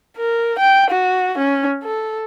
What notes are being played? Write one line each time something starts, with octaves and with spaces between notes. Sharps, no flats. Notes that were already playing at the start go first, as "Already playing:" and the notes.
A#4
G5
F#4
C#4
A4